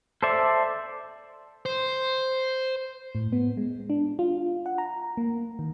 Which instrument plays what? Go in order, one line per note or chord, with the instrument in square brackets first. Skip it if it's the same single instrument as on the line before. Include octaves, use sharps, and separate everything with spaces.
[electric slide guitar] A4 C5 D5 E5
[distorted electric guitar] C5
[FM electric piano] A2
B3
G#3
D4
F4
F#5
A#5
A#3
D#3